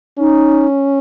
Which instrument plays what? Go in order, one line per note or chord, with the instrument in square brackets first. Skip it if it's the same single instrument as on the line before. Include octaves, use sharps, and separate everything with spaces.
[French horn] C#4 [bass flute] D#4